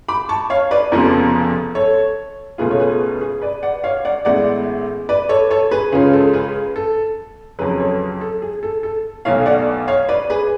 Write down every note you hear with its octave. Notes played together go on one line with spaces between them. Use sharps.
B5 D6
A5 C#6
C#5 F5
B4 D5
F1 F2 C#3 F3 B3
A4 C#5
C#2 B2 A3 F4 G#4 B4
C#5
G#4 B4
G#4 B4
B4 D5
D5 F#5
C#5 F5
D5 F#5
A1 A2 G#3 B3 D5 F#5
B4 D5
A4 C#5
A4 C#5
G#4 B4
C#2 C#3 G#3 C#4 F4 G#4
A4
G#4 B4
A4
F2 C#3 F#3 G#4 B4
A4 C#5
A4
G#4
A4
A4
B1 B2 A3 C#5 F5
D5 F#5
C#5 F5
B4 D5
G#4 B4